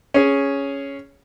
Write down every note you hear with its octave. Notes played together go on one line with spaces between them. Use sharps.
C#4 G#4